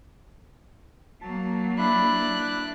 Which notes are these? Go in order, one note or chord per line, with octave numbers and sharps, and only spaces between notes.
F#3 A#3 A5
D4 E4 D5 B5 F#6